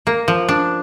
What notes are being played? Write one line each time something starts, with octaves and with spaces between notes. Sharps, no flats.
A#3
F3
D4